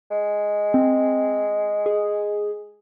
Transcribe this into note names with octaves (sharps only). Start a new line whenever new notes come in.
G#3
C4
G#4